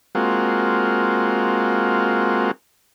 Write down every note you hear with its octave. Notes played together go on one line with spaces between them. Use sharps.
G#3 A#3 C4 F4 F#4